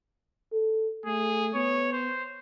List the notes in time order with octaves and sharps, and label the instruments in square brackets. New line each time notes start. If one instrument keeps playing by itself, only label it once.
[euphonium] A4
[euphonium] A3 [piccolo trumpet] G#4
[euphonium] B3 [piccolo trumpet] C#5
[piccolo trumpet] C5